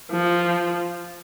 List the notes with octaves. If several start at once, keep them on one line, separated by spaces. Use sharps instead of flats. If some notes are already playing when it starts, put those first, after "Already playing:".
F3